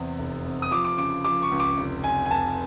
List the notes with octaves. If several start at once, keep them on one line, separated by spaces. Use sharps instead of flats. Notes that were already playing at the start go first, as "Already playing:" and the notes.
Already playing: E2 C3
F1
C3
D#6
F3 D6
D6
C#3 D6
F3 D6
C#6
C#2
D6
F1
F1 G#5
G#5
F1 A5